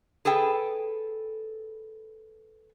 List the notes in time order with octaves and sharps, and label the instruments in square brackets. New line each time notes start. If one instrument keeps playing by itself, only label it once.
[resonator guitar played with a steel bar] G#4 A4 B4 G5